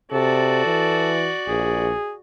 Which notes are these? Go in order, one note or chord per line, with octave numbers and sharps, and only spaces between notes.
C3 F#4 A4 D5
E3
A#1 G#4